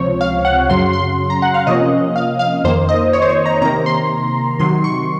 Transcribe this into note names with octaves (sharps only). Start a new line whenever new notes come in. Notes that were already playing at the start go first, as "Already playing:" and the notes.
Already playing: C#2 C3 F3 C4 C#5
F5
F#5
F#2 C#3 F#3 C6
C6
A#5
F#5
F5
C3 F3 A#3 C#4 D#5
F5
F5
F2 D#3 A#3 C5
D#5
C#5
C5
C#5
A#5
C3 D#3 A#3 A#5
C6
C3 D#3 F#3 C6
C#6